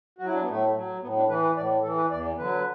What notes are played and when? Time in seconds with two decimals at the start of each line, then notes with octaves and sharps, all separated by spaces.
0.18 F#4
0.21 F#3 E4
0.33 D4
0.42 B3
0.49 A2 A3
0.76 F#3
1.03 A2 B3
1.17 D4
1.29 E3 B4
1.43 B4
1.57 A2 D5
1.83 E3 A4
1.97 B4
2.10 E2 D5
2.38 D3 F#3 B4